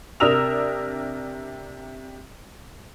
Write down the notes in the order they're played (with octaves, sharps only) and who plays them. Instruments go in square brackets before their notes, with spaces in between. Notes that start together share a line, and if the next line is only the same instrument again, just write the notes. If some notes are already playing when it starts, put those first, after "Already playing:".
[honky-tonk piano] C3 D4 A#4 D#6 E6 F7